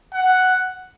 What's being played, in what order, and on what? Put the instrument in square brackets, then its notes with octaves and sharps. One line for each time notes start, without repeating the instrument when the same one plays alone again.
[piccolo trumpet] F#5